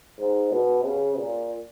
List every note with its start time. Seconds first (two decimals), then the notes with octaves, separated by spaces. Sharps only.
0.18 G#2
0.51 B2
0.84 C#3
1.17 A#2